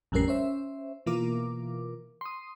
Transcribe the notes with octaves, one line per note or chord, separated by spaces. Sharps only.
A1 F2 G3 C#4 A#4 C7
C#4 C5 E5
B2 E3 A#3 F4 A#4 D6
C6 D#6